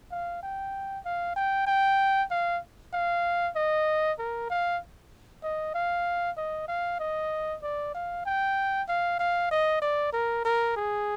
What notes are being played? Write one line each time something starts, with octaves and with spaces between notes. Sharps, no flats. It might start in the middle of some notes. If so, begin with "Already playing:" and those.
F5
G5
F5
G5
G5
F5
F5
D#5
A#4
F5
D#5
F5
D#5
F5
D#5
D5
F5
G5
F5
F5
D#5
D5
A#4
A#4
G#4